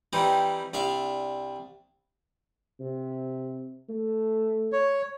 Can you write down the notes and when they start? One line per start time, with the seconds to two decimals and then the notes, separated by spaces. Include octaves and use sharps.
0.13 E3 G3 C4 D#4
0.73 C2 D4 E5 F5
2.80 C3
3.89 A3
4.72 C#5